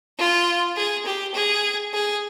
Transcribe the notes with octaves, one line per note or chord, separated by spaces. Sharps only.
F4
G#4
G4
G#4
G#4